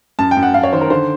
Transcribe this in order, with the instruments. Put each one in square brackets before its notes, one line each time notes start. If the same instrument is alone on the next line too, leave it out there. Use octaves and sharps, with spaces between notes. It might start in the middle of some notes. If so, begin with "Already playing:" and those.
[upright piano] F#2 A5
G5
F#2
F#5
F#2 F5
C#5
D#3 C5
A#4
D3 C5